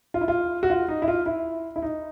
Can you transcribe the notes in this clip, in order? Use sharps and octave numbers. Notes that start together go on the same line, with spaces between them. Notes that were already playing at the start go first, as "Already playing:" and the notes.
F4
E4
F4
F#4
F4
D#4
E4
F4
E4
E4
D#4